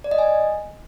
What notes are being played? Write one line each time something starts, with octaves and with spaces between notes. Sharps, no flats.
D5
D#5
G#5